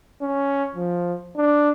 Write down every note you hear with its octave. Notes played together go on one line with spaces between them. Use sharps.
C#4
F3
D4